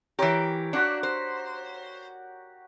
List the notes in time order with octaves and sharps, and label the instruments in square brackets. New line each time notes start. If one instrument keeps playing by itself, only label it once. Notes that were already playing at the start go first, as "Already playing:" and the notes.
[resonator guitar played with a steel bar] E3 G4 [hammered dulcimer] A#4 C#5
[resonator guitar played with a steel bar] D4 [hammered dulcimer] F#4 G4 F#5
[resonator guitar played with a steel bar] C5